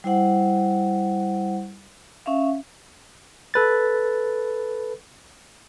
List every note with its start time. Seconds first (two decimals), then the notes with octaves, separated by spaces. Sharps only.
0.04 G3 E4 C5 F#5
2.26 C#4 E5 F5
3.54 A4 B4 A6